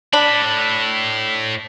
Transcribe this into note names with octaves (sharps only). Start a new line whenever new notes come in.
A2 D4 B5